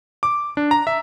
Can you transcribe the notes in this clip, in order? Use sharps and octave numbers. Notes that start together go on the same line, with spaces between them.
D6
D4
A#5
E5